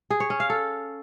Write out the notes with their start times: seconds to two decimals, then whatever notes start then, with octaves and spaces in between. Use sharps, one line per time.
0.10 G#4
0.20 C#5
0.30 C#4
0.40 F5
0.50 A4